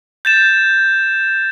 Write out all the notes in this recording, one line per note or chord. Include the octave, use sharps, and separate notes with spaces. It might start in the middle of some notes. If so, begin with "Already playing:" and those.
G6 A6 E7